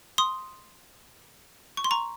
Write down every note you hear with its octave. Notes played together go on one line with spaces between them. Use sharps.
C6 D#6
C#6
C6
A#5 C#6